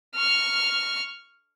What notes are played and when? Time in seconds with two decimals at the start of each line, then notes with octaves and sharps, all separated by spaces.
0.15 C#6 F6